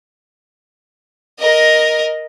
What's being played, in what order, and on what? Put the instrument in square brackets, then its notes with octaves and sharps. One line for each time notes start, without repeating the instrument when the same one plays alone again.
[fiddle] A#4 D#5